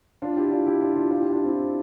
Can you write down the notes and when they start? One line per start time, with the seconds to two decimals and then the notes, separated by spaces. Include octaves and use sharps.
0.22 D4 F4
0.36 E4 G4
0.51 D4 F4
0.66 E4 G4
0.81 D4 F4
0.95 D4 F4
1.10 D4 F4
1.21 E4 G4
1.32 D4 F4
1.44 C4 E4